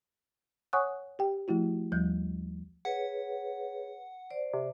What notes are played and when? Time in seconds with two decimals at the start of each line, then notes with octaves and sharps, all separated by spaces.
0.73 C#5 F#5 G#5 C#6 D#6 F#6
1.19 G4 G5
1.48 F3 A3 E4 F#4
1.92 D#2 F3 G3 G6
2.85 G#4 B4 C#5 F#5
4.30 C5 D5
4.54 C3